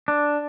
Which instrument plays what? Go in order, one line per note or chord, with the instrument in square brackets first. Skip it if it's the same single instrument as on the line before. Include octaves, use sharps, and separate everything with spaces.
[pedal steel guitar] D4